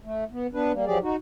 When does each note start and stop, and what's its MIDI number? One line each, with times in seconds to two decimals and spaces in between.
0.04 0.24 57
0.31 0.47 59
0.53 0.72 59
0.53 0.72 62
0.53 0.72 71
0.72 0.85 55
0.72 0.85 58
0.86 0.98 53
0.86 0.98 54
0.86 0.98 67
0.86 0.98 68
0.86 0.98 74
1.02 1.16 63
1.02 1.16 66